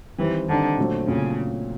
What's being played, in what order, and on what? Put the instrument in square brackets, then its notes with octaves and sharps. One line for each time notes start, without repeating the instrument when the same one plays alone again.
[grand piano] D#3 G3 C4 D#4 [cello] E3
[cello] D3 [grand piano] D#3 G3 C4 D#4
[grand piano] A#2 F#3 A3 C4
[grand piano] A#2 F#3 A3 C4 [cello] C#3